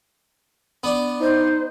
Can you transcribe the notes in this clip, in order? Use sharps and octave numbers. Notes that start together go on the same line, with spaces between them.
B3 D4
D#4 C5